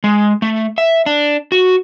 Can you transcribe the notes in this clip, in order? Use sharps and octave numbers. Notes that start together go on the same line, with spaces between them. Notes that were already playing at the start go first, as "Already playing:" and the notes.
G#3
A3
E5
D4
F#4